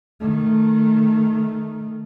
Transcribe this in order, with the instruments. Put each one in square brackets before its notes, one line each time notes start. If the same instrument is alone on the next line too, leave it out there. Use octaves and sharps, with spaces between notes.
[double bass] D#3 A3